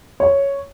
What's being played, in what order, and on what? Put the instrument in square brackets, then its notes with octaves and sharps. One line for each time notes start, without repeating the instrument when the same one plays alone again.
[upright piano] C#5